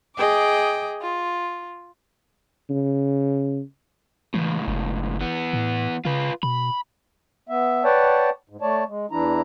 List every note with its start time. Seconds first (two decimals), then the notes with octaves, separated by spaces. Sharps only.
0.16 G#4 D#5 G5 D6
1.01 F4
2.70 C#3
4.34 C#2 A2 E3
4.67 F#1
5.21 E3 B3
5.53 A2
6.05 C#3 F4 B4
6.43 B2 B5
7.49 B3 E5
7.84 B4 C#5 D5 F#5 G5 A5
8.49 G#2
8.61 A3 C#5 D5 A5
8.88 G#3
9.11 E2 E3 D4 E4 A#5